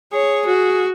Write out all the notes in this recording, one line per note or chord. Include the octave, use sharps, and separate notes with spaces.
G#4 C#5
F#4